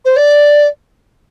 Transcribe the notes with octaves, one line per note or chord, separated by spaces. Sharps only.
C5
D5